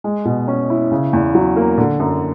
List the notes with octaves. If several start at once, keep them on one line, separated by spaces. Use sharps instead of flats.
G#3
B2
C#4
E4
C#3
E2
F#3
A#3
D3
F#2